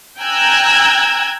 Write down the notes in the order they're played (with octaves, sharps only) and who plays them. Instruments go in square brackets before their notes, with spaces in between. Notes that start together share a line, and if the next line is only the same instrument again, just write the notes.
[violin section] G5 G#5 A#5 E6 F#6 G#6